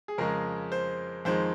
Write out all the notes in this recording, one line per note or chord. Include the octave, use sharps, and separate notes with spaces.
G#4
F2 C#3 G#3 A#4
C5
F2 D#3 G#3 C5